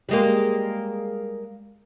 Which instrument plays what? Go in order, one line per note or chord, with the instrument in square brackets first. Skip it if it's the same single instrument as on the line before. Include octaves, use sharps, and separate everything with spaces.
[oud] G3 G#3 A#3